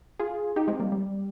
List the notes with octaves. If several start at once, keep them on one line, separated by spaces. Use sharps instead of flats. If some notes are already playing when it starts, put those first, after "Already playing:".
F4 G#4
D#4 G4
G#3 C4
G3 A#3
G3